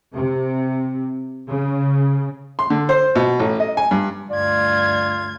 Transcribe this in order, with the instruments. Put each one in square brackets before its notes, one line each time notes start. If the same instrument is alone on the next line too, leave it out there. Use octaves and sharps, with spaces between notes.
[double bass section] C3
C#3
[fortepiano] C6
D3
C5
B2
A1
D#5
G#5
G2
[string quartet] D2 G2 G#6 [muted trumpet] F4 [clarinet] D5